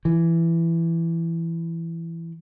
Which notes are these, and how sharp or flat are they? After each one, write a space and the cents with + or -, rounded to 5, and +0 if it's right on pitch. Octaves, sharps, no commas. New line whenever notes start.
E3 +15